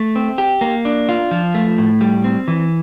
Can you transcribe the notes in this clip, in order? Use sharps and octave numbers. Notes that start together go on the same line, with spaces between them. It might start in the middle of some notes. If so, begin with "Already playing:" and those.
Already playing: A3
C4
G4
A#3
D4
F4
F3
A3
A2
G3
C4
E3